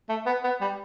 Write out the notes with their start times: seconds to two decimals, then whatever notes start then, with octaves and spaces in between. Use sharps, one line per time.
0.09 A3
0.26 B3
0.44 B3
0.61 G3